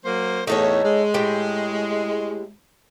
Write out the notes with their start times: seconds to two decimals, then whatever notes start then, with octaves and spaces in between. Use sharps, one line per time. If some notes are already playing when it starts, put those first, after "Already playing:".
0.05 F#3 A#3 C5
0.47 E2 A2 A3 D#4 A4 C#5
0.84 G#3
1.14 A2 G4 G5